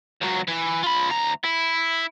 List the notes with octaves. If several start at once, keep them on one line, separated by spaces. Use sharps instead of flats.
C#2 F#3
E3
F4 B5
D2 A#5
E4